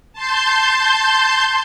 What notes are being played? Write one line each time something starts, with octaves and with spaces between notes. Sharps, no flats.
A5 C6 G6